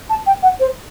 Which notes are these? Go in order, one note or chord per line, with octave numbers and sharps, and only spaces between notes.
A5
G5
F#5
C5